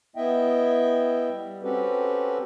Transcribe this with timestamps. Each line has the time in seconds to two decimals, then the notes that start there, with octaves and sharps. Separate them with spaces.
0.16 B3 E4 D#5 E5 G5
1.32 G3
1.63 C4 C#4 F#4 G4 A4 B4